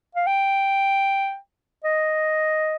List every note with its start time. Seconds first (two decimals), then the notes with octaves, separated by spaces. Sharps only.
0.15 F5
0.27 G5
1.84 D#5